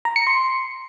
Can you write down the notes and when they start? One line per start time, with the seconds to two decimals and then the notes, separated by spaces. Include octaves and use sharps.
0.05 A#5
0.16 C#7
0.27 C6